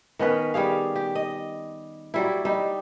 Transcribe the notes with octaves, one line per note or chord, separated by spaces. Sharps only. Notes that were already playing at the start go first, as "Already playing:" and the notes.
D#3 B3 C#4 B4
G3 G4 G#4 F5
G4
D#5
F#3 G3 E4
G3 D#4